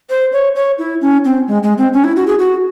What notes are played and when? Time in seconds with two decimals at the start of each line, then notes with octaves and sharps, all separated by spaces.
0.10 C5
0.33 C#5
0.55 C#5
0.79 E4
1.02 C#4
1.25 C4
1.48 G#3
1.63 G#3
1.78 C4
1.93 C#4
2.04 E4
2.16 F#4
2.27 G#4
2.39 F#4